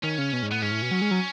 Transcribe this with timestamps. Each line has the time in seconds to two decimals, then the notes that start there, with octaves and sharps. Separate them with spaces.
0.03 D#3 C#4
0.18 C#3
0.33 B2
0.43 G#2
0.51 A2 B3
0.62 G#2 C#4
0.71 A2
0.82 B2
0.91 F#3
1.01 G#3
1.11 F#3